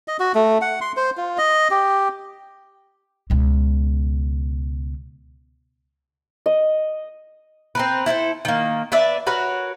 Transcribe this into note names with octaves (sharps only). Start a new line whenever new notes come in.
D#5
F#4
A3
F#5
C6
C5
F4
D#5
G4
C#2 B2
D#5
C4 A#4 B4
E4 A4 B4 C5
D#3 A#3
D4 B4 D5 E5
F#4 A#4 B4 C#5